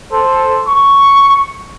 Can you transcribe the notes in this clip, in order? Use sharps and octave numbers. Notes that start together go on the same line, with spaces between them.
A4 C5
C#6